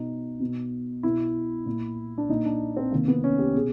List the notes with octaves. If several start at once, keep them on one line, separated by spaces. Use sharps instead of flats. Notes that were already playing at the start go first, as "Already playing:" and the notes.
Already playing: B2 D#4
B2
B2 E4
A#2
D4
A#2 D#4
D4
C4
C3 D#3 A#3
B3
C#4
G4
B2 G#4